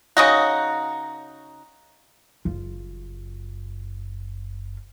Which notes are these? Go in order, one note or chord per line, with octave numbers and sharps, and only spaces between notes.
C#3 D#4 F#4
F#1 F4